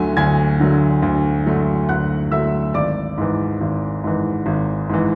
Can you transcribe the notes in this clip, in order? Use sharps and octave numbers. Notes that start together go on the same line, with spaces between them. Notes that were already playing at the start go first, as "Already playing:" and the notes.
Already playing: D2 D3 F#3 A3 G#5
D2 G#5 G#6
D3 F#3 A3
D2
D3 F#3 A3
D2 F#5 F#6
D3 F#3 A3 E5 E6
G#1 D5 D6
G#2 E3
G#1
G#2 E3
G#1
G#2 E3